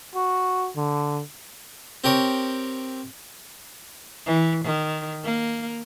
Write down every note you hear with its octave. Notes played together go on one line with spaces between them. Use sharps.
F#4
D3
C4 G4 A#4 C#5
E3
D#3
A#3